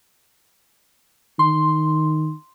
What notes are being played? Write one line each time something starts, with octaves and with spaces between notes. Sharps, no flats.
D#3 C6